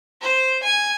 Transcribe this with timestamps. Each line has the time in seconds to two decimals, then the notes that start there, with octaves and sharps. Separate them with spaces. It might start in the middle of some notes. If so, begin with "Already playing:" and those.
0.22 C5
0.63 G#5